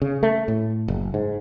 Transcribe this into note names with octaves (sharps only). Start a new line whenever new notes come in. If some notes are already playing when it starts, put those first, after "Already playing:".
C#3
A3
A2
F#1
G#2